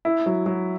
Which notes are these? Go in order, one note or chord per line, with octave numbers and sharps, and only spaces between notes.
E4
F#3
F#3